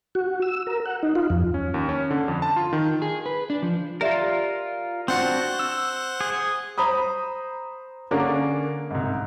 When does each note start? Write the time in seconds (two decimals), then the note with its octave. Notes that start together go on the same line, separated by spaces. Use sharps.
0.15 F#4
0.42 E6
0.67 A#4
0.86 F#5
1.03 D#4
1.15 F4
1.30 F2
1.54 C#4
1.74 D#2
1.89 C#4
2.11 D3
2.28 F2
2.42 A5
2.56 F4
2.73 D#3
3.02 G#4
3.26 B4
3.50 D4
3.63 F3
4.01 F4 G4 A#4 D5 E5
5.08 C4 D4 F#4 C5 F#5
5.59 E6
6.21 G#4
6.78 C5 A#5 B5 D#6
8.11 D3 A#3 C#4 D4 G#4
8.91 C2 G#2